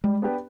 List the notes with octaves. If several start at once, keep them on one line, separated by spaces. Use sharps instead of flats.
G3 G#3
B3 D4 G4 B4